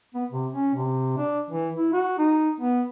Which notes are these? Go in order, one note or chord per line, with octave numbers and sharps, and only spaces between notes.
B3
C3
C#4
C3
D4
E3
E4
F#4
D#4
B3